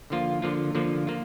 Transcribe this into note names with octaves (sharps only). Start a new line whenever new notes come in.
D3 F3 A#3 F4
D3 F3 A#3 F4
D3 F3 A#3 F4
A#3 F4